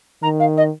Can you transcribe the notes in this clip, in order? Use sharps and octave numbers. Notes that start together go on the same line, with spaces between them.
D#3 A#5
F5
D#5